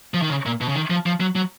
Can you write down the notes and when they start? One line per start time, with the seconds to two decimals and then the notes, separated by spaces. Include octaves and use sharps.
0.14 F3
0.22 D#3
0.30 C#3
0.46 A#2
0.61 B2
0.68 C#3
0.75 D#3
0.90 F3
1.06 F3
1.20 F#3
1.35 F#3